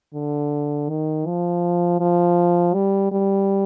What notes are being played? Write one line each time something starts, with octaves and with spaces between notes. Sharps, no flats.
D3
D#3
F3
F3
G3
G3